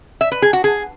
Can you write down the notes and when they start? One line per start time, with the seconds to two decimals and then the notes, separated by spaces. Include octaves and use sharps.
0.21 E5
0.32 B4
0.42 G#4
0.53 F#4
0.64 G#4